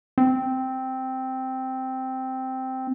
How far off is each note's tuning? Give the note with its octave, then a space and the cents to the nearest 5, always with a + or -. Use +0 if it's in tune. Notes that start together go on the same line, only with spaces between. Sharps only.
C4 -5